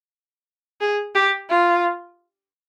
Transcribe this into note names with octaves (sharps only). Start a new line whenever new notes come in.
G#4
G4
F4